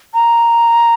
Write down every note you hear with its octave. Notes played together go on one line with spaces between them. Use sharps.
A#5